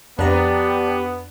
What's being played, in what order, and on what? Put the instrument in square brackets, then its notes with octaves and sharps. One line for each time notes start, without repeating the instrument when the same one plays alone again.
[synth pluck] F2 A#5 [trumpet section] B3 [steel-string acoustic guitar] D4 [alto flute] G4